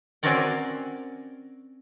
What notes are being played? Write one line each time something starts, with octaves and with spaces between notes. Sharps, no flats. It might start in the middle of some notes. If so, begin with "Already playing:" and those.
C4 C#4 F#4 A#4 D5 G5